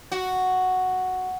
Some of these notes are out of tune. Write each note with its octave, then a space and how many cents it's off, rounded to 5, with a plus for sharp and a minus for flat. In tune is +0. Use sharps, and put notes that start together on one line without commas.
F#4 +0